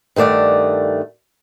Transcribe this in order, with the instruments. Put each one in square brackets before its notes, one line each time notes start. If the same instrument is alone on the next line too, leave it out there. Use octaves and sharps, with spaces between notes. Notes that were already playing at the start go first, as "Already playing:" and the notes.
[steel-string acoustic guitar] G2 D#3 A3 D5 F#5